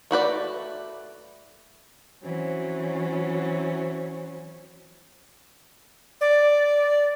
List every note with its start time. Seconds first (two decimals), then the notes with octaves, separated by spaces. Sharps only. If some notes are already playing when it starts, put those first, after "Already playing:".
0.11 A3 F#4 B4 D5
2.24 E3 F#3 C4 C#4
6.21 D5